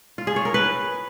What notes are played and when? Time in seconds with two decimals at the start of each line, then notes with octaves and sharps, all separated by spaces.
0.18 F4
0.27 G#4
0.36 C#5
0.45 A#4
0.54 B4